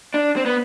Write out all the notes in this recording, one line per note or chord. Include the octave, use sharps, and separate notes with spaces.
D4
C4
B3